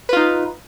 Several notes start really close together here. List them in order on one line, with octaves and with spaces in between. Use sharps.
B4 F4 D#4